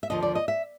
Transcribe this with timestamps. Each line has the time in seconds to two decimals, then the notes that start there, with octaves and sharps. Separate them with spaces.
0.03 E5
0.10 D#2 D3 F3 D#5
0.22 D5
0.35 D#5
0.48 E5